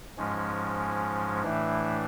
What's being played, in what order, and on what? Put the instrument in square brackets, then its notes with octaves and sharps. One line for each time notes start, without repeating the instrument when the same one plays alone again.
[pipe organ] G#2 F3 G#3 C#4
A2 E3 A3 D4